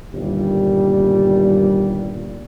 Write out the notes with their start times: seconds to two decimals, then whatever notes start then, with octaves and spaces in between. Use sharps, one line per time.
0.13 G1 D#2 A#2 G3